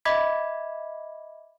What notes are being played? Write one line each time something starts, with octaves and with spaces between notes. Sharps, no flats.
D#5 E5 B5 D6 G#6 B6